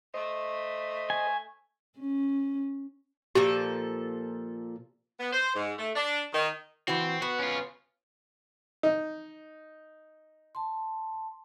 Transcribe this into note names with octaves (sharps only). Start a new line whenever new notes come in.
A3 C5 D#5
G#5
C#4
A#2 F3 G4 A4
B3
C5
G#2
A3
D4
D#3
A#2 E3 C4 F#4
B3 F#4
C#4 F4
D#4
A5 C6